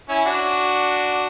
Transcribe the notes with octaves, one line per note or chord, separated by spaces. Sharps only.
C#4 E4
D4 F#4